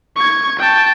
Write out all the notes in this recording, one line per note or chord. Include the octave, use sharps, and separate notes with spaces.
C#6 G#6
G5 A5